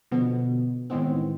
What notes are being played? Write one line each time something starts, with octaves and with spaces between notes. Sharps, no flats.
B2 D3 F3 B3
A2 D#3 E3 G#3 B3 C4